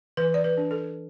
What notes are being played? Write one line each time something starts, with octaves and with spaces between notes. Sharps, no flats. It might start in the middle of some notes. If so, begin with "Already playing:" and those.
E3 B4
D5
B4
D4
A4